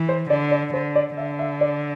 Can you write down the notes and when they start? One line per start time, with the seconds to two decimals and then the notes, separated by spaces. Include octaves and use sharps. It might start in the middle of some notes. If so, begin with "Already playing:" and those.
Already playing: E3
0.09 C5
0.30 D3 D5
0.51 D5
0.73 D3 C5
0.95 D5
1.17 D3 E5
1.39 E5
1.61 D5